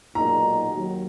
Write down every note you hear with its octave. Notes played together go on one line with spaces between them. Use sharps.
B1 A#2 G#3 D#4 F#4 A#5
D#2 D#3 F#3